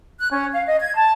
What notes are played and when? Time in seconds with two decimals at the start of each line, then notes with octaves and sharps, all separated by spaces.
0.19 F#6
0.32 C#4
0.54 F5
0.67 D#5
0.80 G#6
0.97 A5